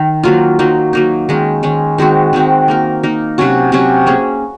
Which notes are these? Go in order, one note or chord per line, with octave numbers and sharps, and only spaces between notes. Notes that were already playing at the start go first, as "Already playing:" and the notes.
Already playing: D#3
D#3 F#3 A#3 F4
F#3 A#3 D#4
F#3 A#3 D#4
D#3 G#3 C#4
D#3 G#3 C#4
D#3 G#3 C4 F#4
D#3 G#3 C4 F#4
A#3 D#4 A#4
A#3 D#4 A#4
C3 F#3 C#4 F#4
C3 F#3 C#4 F#4
A#3 C#4 G#4